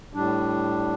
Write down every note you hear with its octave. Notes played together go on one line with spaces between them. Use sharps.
A2 G3 D4